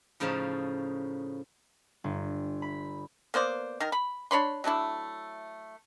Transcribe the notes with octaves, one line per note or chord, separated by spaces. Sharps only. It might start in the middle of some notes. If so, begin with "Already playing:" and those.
A2 C#3 F3 D#4 A5
G1
B5
A#3 B3 C5 D5
D#3 A#4
B5
D4 C#5 B5 C6
F#3 A3 D4 E4